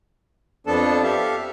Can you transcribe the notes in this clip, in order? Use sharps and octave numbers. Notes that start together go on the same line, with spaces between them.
F2 F3 B3 D4 A4 A5
G4 A4 E5 F5